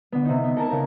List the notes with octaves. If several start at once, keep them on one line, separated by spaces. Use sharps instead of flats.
D3 B3
C3 D#4
B3
A4 A#4 G#5 A5
C#3 A#4